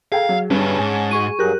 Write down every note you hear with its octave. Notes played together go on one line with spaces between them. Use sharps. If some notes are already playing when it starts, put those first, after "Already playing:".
G#4 A4 F5 G5 A#5
F#3
G2 G3 B3 C#4 A5
G#2 G#5
G#3 F#4 G#4 C#6 D#7
G2 F#3 G4 G#4 A#4 F#6